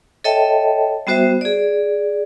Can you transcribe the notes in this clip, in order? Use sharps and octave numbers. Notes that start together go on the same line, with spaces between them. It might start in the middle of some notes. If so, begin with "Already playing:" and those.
A4 C#5 D#5 E5 G5 A5
G3 B3 F#4 C5 E5
G#4 D5